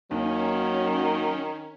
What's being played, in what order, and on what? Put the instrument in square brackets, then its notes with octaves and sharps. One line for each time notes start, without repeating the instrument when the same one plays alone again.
[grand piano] D#2 [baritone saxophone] D#3 [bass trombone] F#3 [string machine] C#4